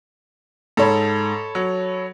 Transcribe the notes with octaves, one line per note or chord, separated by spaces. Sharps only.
G#2 A4 C#5 B5
F#3